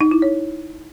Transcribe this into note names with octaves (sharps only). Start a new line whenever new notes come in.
D#4
E4
C#5